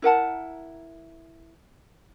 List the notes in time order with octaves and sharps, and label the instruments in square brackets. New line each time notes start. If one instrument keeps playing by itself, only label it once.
[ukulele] E4 A#4 F#5 A5